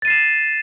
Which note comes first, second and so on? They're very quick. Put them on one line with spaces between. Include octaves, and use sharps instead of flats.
A6 D#7 C7 E7